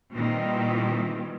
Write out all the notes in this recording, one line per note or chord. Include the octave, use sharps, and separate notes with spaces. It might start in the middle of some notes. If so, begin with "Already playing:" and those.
A#2 D#3 E3 G3 C4